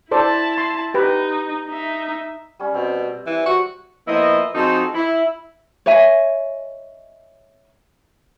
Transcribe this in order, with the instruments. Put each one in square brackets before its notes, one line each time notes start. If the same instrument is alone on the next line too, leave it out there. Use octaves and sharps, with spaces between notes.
[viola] E4 A5 [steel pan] A4 C5 D5
[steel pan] C6
[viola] D#4 [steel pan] G4 B4
[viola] D#4 E5
[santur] G3 C#4
[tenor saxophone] B2 [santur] C4
[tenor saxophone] E3
F#4
[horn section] F3 A#3 B3 E4 D#5
F3 C4 D#4 F#4 G#4 A4
E4
[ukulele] C#5 D#5 E5 G#5